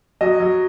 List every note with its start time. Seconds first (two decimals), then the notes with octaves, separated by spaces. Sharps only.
0.21 F#3 D#5
0.40 F#3